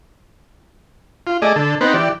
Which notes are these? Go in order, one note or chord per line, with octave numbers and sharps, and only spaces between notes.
F4
A3 G#4 D5 D#5
D3 A4
B3 C4 D#4 B4 C5
E3 G4 D5